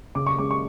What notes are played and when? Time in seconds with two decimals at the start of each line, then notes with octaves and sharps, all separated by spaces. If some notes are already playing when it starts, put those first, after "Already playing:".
0.15 C#3 D6
0.26 C#6
0.38 G#3 C#4 D6
0.51 C#6